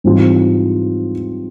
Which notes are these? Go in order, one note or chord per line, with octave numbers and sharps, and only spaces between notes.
G#2 E3 G3 C4 F4